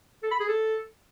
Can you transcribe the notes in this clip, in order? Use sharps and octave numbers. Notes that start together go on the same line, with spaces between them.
A4
B5
G#4
A4